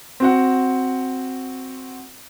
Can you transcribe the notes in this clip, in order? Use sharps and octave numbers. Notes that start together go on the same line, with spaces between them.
C4 F#4 F#5